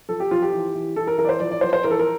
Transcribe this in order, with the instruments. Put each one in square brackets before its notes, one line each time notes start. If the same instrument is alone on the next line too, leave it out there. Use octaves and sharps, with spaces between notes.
[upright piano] F3 A4
G4
F3 F4
G4
E3
E3
E3 A4
A#4
E3 A#4
D5
C5
F3 D5
D5
F3 C5
C5
E3 A#4
A4
A#4